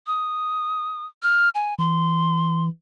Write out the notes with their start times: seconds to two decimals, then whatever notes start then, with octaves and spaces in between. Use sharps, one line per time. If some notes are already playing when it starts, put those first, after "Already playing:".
0.07 D#6
1.23 F6
1.55 G#5
1.79 E3 C6